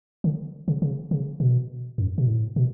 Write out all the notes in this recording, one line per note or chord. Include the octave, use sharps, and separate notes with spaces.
D3
C#3
C#3
C#3
B2
F#2
B2
A2
B2